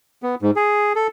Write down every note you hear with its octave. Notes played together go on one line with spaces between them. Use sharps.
B3
G#2
G#4
A4